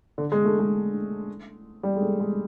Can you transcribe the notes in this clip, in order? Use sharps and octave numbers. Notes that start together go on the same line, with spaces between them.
D3
G#3
A3
G#3
G3
G#3
A3
G#3